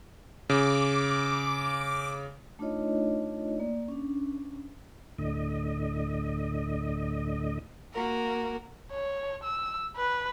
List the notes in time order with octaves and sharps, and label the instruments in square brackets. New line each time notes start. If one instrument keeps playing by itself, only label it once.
[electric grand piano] C#3 [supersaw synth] D6
[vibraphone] A3 D4 D#4 F4 C#5 D#5
A#3 D5
C#4 D4
[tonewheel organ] D2 A2 D3 D#5
[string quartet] A#3 F#4 A#4
[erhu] C#5
E6
B4